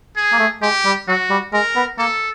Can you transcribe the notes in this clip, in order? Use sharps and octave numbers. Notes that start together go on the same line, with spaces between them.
G#4
A#3
A3
G#3 G4
G3
F#3 F#4
G3
G#3 A#4
B3
A#3 A4